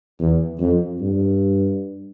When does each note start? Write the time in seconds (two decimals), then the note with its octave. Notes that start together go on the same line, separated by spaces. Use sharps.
0.19 E2
0.60 F2
1.01 G2